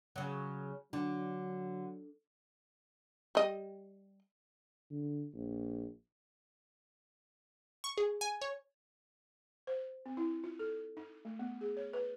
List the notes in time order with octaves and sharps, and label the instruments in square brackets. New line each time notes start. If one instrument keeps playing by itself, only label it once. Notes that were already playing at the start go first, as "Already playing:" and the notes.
[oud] C#3 F#3
[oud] D3 [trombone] F#3 [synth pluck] D4
[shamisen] G3 D#5
[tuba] D3
A#1
[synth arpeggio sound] C#6
G#4
G#5
C#5
[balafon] C5
C4
E4
F4
A4
D#4
A3
B3
G#4
C#5
B4